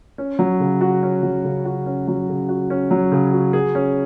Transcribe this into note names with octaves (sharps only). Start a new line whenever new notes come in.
C#4
F#3
C#3
F#4
C#4
F#3
C#3
F#4
C#4
F#3
C#3
F#4
C#4
F#3
C#3
F#4
G#4
C#4